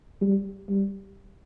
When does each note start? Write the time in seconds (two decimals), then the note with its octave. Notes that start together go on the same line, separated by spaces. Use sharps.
0.22 G3
0.69 G3